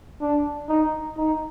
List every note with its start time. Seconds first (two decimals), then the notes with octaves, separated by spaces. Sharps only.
0.21 D4
0.69 D#4
1.17 D#4